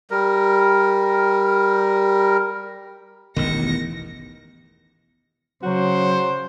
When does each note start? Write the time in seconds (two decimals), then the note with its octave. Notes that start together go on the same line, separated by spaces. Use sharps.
0.11 G3 A#4
3.36 E1 A1 E2 G2 D#3 A#6 C#7
5.63 C#3 F#3 F#4 C5